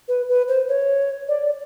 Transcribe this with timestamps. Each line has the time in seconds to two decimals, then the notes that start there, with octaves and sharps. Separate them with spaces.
0.08 B4
0.29 B4
0.48 C5
0.68 C#5
1.28 D5